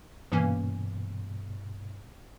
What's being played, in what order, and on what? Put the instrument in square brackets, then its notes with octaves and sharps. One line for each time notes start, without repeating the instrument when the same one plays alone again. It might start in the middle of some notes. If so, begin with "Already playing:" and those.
[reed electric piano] G2 B2 [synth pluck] E3 A#3 C#4